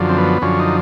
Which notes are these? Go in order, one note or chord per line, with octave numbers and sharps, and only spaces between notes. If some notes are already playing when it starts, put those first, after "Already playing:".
Already playing: F#2 D3 F3
C4
B3
F#2 D3 F3 C#4
D#4